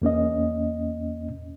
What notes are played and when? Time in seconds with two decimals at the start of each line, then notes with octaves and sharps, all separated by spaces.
0.02 E2 A#3 C#4 D#5